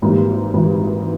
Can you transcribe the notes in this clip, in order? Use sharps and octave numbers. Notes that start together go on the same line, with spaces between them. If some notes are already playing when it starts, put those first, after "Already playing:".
G#1 G#2 E3 G3 A#3
G#1 G#2 E3 G3